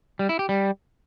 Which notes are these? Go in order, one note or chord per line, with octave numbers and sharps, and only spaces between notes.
G3
E4
G4
G3